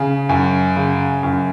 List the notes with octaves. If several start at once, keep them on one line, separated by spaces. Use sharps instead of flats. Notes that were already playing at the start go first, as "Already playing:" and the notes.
Already playing: C#3
F#2
C#3
F#2